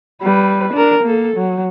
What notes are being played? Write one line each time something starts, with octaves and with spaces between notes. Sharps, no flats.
G3 B4
D4 A#4
A#3 A4
F#3